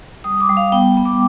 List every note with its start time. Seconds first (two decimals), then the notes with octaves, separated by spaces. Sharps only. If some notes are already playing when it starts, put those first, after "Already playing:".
0.24 G3 D#6
0.40 D6
0.49 G3
0.57 F5
0.72 B3 G5
0.97 B3
1.05 D6